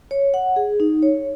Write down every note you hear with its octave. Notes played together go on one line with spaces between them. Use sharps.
C#5
F#5
G#4
D#4
C#5